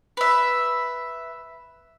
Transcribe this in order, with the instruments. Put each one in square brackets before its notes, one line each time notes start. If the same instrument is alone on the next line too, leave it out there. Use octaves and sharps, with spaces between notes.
[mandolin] B4 E5